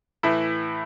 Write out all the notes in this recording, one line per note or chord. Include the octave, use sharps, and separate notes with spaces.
A2 E3 E4